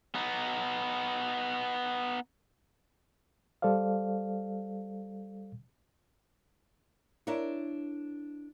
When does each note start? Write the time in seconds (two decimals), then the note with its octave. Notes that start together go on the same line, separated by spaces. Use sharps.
0.15 B3 D#4
3.62 G3 A4 C5 D5 F5
7.27 D4 E4 A#4 C#5